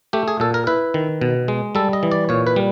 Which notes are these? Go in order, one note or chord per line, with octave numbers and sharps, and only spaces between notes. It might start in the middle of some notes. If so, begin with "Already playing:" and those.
A3 G4
G#4
A#2 A4
A#4
E4 B4
D#3
B2
G#3
G3 A4
D#5
E3
D5
A#2 C#5
B4
G3